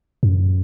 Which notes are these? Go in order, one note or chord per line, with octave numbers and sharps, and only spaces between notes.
F#2